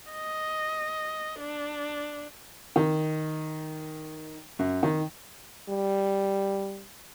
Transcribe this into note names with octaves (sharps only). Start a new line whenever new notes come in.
D#5
D4
D#3
F#2
D#3
G3